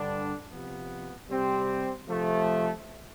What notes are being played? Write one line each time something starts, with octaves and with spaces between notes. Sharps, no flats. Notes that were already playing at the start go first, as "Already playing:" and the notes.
Already playing: G2 D3 G3 D4
C3 F3 B3
C3 G3 C4 G4
C3 F3 A3